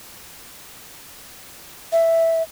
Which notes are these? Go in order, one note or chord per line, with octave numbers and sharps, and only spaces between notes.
E5